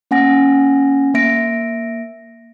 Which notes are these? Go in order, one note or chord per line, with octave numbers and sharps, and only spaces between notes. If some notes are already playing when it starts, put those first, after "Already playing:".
A#3 C#4 F#5 G#5 A#6
A#3 E5 A#6 D7